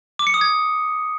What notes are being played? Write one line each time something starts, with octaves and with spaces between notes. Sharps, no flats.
D6
C#7
D#6
G#6